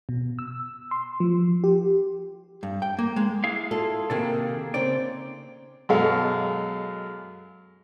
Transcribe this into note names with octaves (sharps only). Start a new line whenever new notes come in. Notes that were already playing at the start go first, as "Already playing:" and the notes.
B2
E6
C6
F3
G4
G2
G5
A#3
G#3
E4 G#4 F5
F4 A4
C3 D#3 A#3 G#4 A4
C#3 C4 D#4 C#5 D5
F#2 B2 G#3 A4 F5